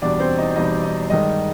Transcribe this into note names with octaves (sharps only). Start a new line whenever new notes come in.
E2 B2 G3 D4 D5
C4 C5
D#4 D#5
E2 B2 G3 D#4 D#5
D#4 D#5
G2 D#3 G#3 D#4 D#5